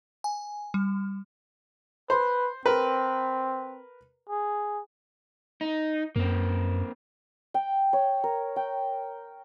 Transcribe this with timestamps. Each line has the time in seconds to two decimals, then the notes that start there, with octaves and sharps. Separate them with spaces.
0.24 G#5
0.74 G3
2.10 B4 C5
2.66 C4 A#4 B4
4.30 G#4
5.61 D#4
6.16 F#2 A#3 C4
7.54 G5
7.93 C#5
8.24 A#4
8.56 G5